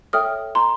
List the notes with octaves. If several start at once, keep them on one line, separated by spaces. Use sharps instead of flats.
A4 C#5 E5 G5 D#6 F6
A#5 C6